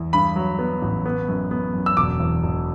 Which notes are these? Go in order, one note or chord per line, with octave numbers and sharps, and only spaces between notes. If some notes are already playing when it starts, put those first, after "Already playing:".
Already playing: E2
G2 B5
F#3
B3
A1
B3
F#2
B3
F#2
E6
E1 D6
E2
E1